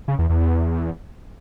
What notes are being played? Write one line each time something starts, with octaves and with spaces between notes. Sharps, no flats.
C#3
E2
E2
E2